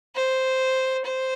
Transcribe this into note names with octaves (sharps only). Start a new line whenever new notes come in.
C5
C5